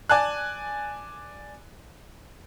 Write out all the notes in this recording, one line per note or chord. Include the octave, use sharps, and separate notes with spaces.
D5 G#5 A5 F#6